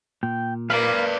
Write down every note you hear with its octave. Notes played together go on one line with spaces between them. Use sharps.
A#2 G5
A#3 B4 D5 F5 B5